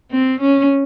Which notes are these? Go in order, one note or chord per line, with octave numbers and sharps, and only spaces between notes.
C4
C#4